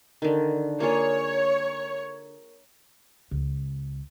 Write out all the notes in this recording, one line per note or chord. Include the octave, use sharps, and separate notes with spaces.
D3 D#3
A#3 F4 G#4 C#5
C#2